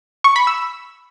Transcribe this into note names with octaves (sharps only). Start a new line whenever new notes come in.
C#6
B5
E6